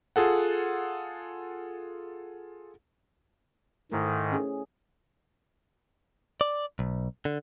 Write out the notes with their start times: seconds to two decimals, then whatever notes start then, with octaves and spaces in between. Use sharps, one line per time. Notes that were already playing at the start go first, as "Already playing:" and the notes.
0.16 F4 G#4 A4 F#5
3.92 G#2 D#3 A3 E4 C5
4.32 C#4 G#4
6.41 D5
6.79 B1
7.25 D3